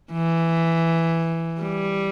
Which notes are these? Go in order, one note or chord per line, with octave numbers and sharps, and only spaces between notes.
E3
G3